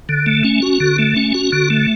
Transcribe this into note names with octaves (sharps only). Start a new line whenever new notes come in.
D3
A3
C#4
F#4
D3
A3
C#4
F#4
D3
A3